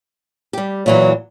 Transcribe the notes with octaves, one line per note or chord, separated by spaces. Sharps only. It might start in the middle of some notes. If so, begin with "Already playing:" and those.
G3 G4
A#2 E3 F#3 C#5